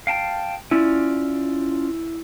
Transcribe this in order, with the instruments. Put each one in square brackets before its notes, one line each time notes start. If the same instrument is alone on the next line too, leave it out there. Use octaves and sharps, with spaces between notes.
[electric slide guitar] F5 G5 A5
[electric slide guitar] C#4 F4 D5 [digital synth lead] E4